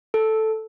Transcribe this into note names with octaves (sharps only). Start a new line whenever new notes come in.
A4